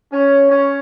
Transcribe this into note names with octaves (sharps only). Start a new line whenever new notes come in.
C#4
C#4